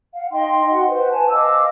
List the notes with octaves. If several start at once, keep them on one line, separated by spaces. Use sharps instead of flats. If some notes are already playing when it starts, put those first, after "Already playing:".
F5 F#5
D#4 D#5 G5 C6
F#4 F#5
B4 C5
G#5 A5
D#5 F5 D6 E6